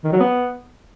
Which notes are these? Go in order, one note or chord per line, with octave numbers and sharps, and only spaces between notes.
D#3
F#3
B3